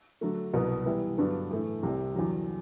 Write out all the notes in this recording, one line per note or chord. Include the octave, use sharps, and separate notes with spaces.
D3 F#3 A3
C2 B2 F#3 B3
E3 G3 B3 E4
G2 D3 F#3 B3 D4
A2 E3 A3 E4
C2 C3 G3
E2 D3 F#3